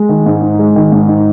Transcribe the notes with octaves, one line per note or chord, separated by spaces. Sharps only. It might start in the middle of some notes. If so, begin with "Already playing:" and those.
Already playing: G#3
D#3
G#2
D#4
G#3
D#3
G#2
D#4